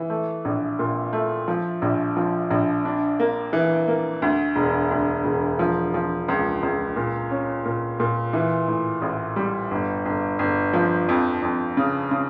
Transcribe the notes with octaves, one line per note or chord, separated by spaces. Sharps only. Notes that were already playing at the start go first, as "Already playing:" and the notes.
Already playing: E3
A3
A#1
A#2
A3
F3
A#1
F3
A#1
D4
A#3
E3
A#3
D2
E1
D2
E1
F3
F3
C#2
C#2
A#2
C#4
A#2
A#2
E3
A2
A1
G3
G1
G1
G1
F3
F2
F2
C#3
C#3